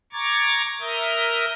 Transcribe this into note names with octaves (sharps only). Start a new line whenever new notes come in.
A#5 C#6 D6 G#6 A6
A#4 E5 A#5 D#6 G6